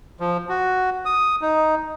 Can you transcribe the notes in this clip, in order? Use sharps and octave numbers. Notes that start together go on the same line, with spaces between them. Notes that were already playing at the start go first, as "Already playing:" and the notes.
F3
F#4
D#6
D#4